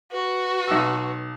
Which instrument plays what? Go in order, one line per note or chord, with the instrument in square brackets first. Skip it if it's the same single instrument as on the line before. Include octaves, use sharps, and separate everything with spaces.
[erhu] F#4 [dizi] B4
[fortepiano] B1 E6